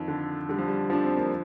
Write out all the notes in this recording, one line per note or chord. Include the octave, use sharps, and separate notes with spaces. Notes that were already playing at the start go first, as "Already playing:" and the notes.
Already playing: F2 D#3
D3
D3 G3
F3
G3
F3 D4
C4
A#3